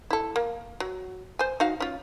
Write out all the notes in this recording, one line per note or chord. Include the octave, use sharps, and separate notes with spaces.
E4 A4
A#3
F#3
C5 G#5
D#4 F#4 F5
C#4 F4